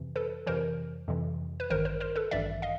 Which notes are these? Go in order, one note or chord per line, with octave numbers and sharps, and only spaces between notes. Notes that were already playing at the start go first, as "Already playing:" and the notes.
Already playing: F2 C3 E3
A4 B4
F2 C3 E3 A#4 C5
F2 C3 E3
B4
A1 G2 D#3 A#4 C5
A#4 C5
A#4 C5
A4 B4
A1 G2 D#3 D5 E5
D#5 F5